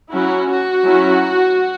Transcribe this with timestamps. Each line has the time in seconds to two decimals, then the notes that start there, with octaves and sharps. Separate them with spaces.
0.11 F#3 C#4 E4 F#4
0.49 F#4
0.85 F#3 C#4 E4